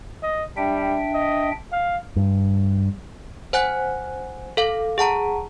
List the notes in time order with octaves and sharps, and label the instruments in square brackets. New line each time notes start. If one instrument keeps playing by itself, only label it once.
[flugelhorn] D#5
[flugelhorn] G3 [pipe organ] D4 E5 G5
[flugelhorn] D#5
F5
[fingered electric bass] G2
[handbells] C5 F#5 G#5 F#6
A4 F5
G#4 F#5 A5 A#5